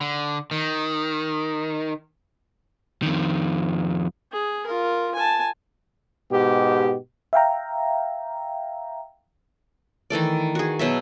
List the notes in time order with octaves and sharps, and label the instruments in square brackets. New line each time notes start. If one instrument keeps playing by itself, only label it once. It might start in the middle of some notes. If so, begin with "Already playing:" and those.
[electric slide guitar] D3
D#3
[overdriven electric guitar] F2 D#3
[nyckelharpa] G#4
F4 A#4
G#5 A5
[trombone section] G#2 B2 G4
[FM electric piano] E5 F5 G5 A#5
[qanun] D#3 E3 A3 D5
F#4 G#4
B2 F#3 E5